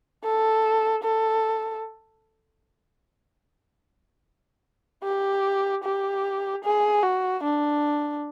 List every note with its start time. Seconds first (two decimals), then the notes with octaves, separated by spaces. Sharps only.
0.24 A4
1.03 A4
5.03 G4
5.83 G4
6.64 G#4
7.03 F#4
7.43 D4